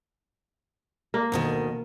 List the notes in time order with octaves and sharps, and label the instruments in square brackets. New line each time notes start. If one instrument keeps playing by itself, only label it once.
[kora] A#3
[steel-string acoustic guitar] D2 B2 D#3